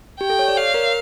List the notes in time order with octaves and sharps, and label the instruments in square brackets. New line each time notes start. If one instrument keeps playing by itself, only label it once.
[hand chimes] G4 [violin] G5
[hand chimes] A4
C#5
D5
[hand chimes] C#5 [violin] F5
[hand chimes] A#4